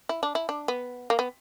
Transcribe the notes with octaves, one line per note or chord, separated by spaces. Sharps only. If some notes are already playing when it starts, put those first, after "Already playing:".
E4
D4
E4
D4
B3
A#3
B3